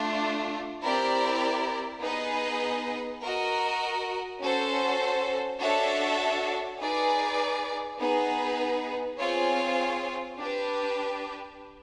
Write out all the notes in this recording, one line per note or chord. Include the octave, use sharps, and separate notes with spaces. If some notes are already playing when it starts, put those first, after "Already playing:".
Already playing: A3 D4 F4
C4 E4 G4 A#4 D5
B3 D#4 G#4 B4 D#5
F#4 A#4 D#5
C#4 F#4 A4 C5
D4 F#4 A4 C#5 E5
D#4 G#4 B4 D5
B3 D#4 G#4 B4
C4 F4 G#4 C#5
D4 G4 B4